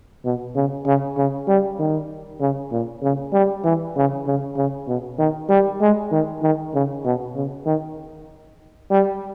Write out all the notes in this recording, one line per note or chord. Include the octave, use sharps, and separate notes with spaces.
B2
C#3
C#3
C#3
G3
D#3
C#3
A#2
C#3
G3
E3
C#3
C#3
C#3
B2
D#3
G3
G#3
D#3
D#3
C#3
B2
C#3
D#3
G3